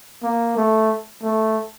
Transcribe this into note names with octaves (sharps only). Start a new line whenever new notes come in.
A#3
A3
A3